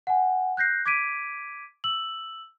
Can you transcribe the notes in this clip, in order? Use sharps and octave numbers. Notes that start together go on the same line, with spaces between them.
F#5 G#5
F#6 G6 A#6 C7
D6 G#6 B6 D7 D#7
E6 F#7